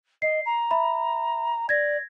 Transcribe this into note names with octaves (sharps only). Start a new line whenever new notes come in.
D#5 C7
A#5
E5 B5
D5 G#6 A#6